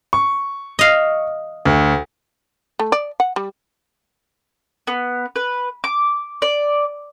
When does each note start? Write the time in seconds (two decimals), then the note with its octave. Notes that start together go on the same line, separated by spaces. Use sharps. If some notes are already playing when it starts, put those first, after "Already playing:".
0.13 C#6
0.79 D#5 F5
1.65 D2
2.79 A3
2.92 D5
3.20 F#5
3.36 G3
4.87 B3
5.36 B4
5.84 D6
6.42 D5